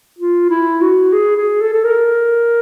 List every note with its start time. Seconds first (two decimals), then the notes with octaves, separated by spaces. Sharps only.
0.19 F4
0.50 E4
0.81 F#4
1.13 G#4
1.37 G#4
1.61 A4
1.73 A4
1.84 A#4